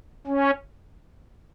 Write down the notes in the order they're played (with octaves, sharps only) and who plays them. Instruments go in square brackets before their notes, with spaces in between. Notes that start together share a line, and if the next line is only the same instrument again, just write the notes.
[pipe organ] C#4